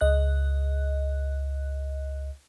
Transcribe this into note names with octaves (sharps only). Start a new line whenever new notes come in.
C#2 D#5 F#6